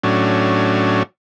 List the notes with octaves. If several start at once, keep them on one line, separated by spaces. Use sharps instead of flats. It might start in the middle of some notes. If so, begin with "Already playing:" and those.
A2 F#3 C#4 D4